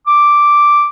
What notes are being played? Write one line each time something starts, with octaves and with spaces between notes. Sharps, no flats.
D6